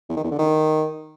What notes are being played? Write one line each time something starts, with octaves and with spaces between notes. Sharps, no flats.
E2
D#3
E2
D3
D#3